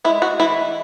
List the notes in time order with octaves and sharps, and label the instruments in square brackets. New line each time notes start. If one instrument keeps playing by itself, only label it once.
[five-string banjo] G#3 E4
F#4
E3 E4